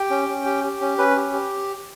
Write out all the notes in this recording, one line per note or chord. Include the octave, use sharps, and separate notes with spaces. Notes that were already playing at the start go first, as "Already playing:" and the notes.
Already playing: G4 G5
C#4
C#4
G4
G4
C#4
C#4 B4
G4
G4